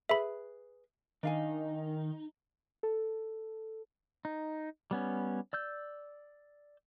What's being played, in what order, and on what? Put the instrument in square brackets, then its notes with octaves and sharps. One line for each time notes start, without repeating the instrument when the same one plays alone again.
[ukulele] G#4 B4 [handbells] E5 B5
[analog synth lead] D#3 [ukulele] D4 F5 G#5 [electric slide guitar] D#4
[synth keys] A4
[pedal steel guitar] D#4
G3 B3 C#4
D5 E6 G6